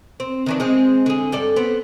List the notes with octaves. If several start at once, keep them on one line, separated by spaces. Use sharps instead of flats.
C4
D#3 E3 D4
G#3 C4
D3 G#4
G2 A4 D5
B3 C4